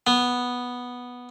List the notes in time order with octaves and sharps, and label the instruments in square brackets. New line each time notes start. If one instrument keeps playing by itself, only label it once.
[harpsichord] B3